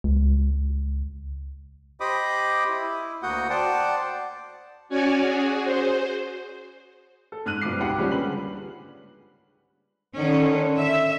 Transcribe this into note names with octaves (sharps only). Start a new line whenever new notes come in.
C#2
G4 C5 D#5 B5 D6 D#6
E4
D2 A#3 F#4 F#5 D#6 G6
C5 D5 F#5 G5 A5
C#4 F#4 C#5 D5 G#5
F#4 G#4
C5
A4
G#2 F6 F#6 D#7 F#7
G2 B2 F3 D6 C7
C#2 G#2 G4 F#5
F3 G3 G#3 A#3 C#4
D3 B4 F#7
D3 D#3 C#4
E5